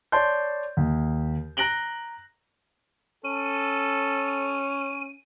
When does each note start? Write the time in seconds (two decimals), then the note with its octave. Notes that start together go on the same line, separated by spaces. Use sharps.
0.12 C#5 D5 A5 C6 G6
0.77 D#2
1.57 A#5 F#6 A#6 D7 F#7 G7
3.24 C#4 A4 D#7